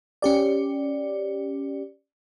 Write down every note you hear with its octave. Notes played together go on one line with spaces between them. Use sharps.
C#4 G4 D5